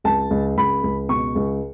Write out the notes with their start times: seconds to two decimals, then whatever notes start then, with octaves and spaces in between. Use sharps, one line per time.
0.04 C#2 A5
0.31 C#2
0.57 C#2 B5
0.84 C#2
1.09 B2 C#6
1.35 C#2